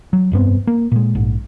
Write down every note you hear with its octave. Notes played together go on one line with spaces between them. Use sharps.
F#3
F1 G2 B3 C4
A#3
A#2 G#3
A#1 G#2